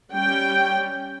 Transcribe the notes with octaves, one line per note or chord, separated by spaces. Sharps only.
G3 C#4 G5